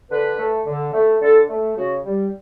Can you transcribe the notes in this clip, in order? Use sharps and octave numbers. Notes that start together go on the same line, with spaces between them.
D3 B4
A3
D3
A3
D3 A4
A3
C#3 F#4
G3